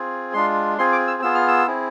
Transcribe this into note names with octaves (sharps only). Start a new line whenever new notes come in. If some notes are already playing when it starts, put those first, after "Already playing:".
Already playing: C4 F4 G#4
G#3 D4 F4 C6
C4 F4 G#4 C6
D6
E6
B3 F4 G#4 E6
F6
E6
C4 E4 G#4